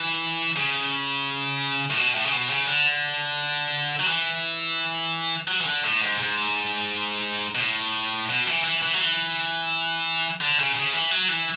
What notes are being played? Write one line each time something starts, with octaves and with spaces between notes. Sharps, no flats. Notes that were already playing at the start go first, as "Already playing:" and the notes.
Already playing: E3
C#3
A2
B2
A2
C#3
B2
C#3
D3
F#3
E3
F#3
E3
D3
A2
G#2
G#2
B2
A2
B2
E3
E3
E3
F#3
E3
D3
C#3
C#3
E3
F#3
E3